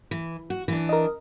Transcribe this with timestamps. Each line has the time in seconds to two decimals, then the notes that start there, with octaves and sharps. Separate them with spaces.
0.11 E3
0.50 F#4
0.68 E3 D4
0.89 A#4 D#5